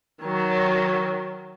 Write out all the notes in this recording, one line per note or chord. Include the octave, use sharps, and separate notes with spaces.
D#3 F#3